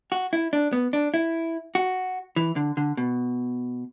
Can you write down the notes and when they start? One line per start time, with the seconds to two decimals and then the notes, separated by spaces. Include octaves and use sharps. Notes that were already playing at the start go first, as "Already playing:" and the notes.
0.12 F#4
0.33 E4
0.53 D4
0.73 B3
0.93 D4
1.14 E4
1.75 F#4
2.36 E3
2.56 D3
2.77 D3
2.97 B2